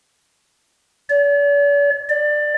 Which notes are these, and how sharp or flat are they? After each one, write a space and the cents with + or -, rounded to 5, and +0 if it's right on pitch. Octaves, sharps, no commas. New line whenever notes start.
D5 -45
D5 +15